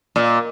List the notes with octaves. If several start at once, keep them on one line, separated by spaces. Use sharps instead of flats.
A#2